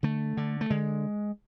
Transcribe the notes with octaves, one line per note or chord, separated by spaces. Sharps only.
D3 A3
D3
A3
D3 G#3